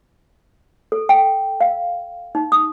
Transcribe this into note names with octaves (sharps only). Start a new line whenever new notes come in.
A4
G5
F5
D#4
D#6